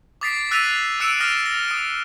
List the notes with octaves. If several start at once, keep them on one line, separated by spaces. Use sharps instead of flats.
D6 D#6 A6 B6 C7 D7
E6 F#6 A6 B6 D#7 F7
E6 F#6 C#7 D7 E7 F7
D#6 F6 A#6 D7 E7
A#6
D#6 D7